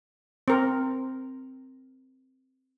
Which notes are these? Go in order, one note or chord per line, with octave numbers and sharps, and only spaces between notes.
C4 A#4